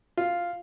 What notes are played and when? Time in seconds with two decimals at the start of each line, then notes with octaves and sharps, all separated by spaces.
0.17 F4